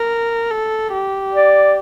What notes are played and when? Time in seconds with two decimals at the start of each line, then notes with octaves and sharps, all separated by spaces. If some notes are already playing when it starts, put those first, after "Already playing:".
Already playing: A#4
0.51 A4
0.93 G4
1.33 D5